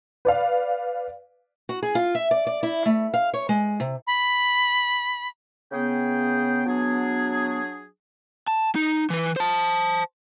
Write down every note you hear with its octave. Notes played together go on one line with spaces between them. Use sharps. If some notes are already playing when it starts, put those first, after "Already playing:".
B4 D5 F5
F#4
G#4
F4
E5
D5
D5
E4
A3
F5
C#5
G#3
C3
B5
C#3 B3 G#4 G5
F#3 D4 G#4
A5
D#4
E3 B4
C5 A5